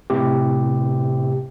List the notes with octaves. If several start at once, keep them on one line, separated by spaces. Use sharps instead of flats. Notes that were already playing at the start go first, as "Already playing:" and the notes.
A2 C3 G4